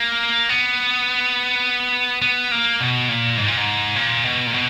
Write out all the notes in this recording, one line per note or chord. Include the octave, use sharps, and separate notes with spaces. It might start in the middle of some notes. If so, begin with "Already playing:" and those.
Already playing: A#3
B3
B3
A#3
B2
A#2
G#2
A#2
G#2
A#2
B2
A#2
B2